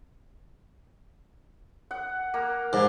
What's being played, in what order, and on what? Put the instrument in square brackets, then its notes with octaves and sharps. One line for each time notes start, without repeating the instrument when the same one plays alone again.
[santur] F#5
A#3
[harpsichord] G#2 [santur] D5 F5